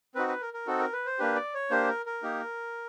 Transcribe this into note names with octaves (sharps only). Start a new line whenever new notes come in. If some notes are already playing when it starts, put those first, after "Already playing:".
C4 D#4 F#4 B4
B4
A#4
A#4
C4 D#4 F#4 A4
A#4
B4
C5
A#3 D4 G4 B4
D5
C#5
A#3 D4 G4 C5
A#4
A#4
A#3 D#4 G4